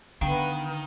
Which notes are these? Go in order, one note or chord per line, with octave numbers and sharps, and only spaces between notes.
D3 D#3 B3 F5 G5